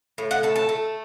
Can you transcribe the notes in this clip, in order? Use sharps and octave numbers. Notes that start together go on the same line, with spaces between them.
A2
F#5
A3 A5
A5
A3